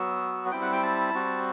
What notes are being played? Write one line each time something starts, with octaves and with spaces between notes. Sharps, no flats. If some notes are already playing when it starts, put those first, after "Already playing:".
Already playing: F#3 B3 F#4 E6
F#5
G3 C4 E4 G5
F#5
G5
A5
G3 C4 F#4